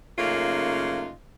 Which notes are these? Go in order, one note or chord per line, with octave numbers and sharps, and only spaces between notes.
F#2 C#3 A3 A#3 D#4 F4